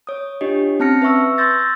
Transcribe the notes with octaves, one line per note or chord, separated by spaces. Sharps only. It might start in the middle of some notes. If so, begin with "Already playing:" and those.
C#5 D#6
D4 F4 G4 C#5 D#5
C4 C#4 A5 F6 A#6 C#7
B4 E5 C#6 E6
C6 E6 G6 A6 A#6